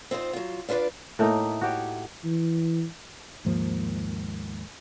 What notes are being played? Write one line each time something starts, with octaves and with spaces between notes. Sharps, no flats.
C4 D#4 F4 C5
F#3 F4
D4 F4 B4 C5 D5
A2 A3 A#3 D#4
F#4 G4 C#5
E3
D#2 G#2 F3 A#3